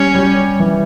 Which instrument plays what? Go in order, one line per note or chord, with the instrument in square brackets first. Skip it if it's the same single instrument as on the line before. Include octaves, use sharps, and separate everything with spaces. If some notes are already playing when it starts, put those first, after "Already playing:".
Already playing: [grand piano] G3 [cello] C#4
[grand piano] G3
E3